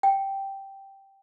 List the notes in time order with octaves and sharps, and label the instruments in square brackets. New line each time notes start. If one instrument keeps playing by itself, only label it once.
[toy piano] G5